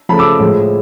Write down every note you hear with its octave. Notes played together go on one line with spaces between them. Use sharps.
C#3 F3 A3 A5 B5
D6 E6
A2 F3 G#3